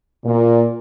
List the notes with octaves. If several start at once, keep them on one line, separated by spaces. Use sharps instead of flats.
A#2